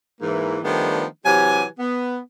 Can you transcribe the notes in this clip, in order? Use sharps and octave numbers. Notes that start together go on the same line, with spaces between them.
G#2 E3 A#3
D#3 F3 G3 A3 B3 D4
C3 E3 F#3 G4 G#5
B3